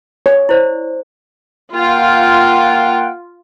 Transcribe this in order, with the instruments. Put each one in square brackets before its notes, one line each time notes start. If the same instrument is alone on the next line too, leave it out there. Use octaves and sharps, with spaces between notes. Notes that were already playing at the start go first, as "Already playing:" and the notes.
[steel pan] C#5
[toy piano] E4 C5 D5
[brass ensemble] A#3 F#5 G5 [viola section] F4